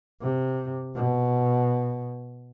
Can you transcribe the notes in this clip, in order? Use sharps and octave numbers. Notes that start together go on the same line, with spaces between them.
C3
B2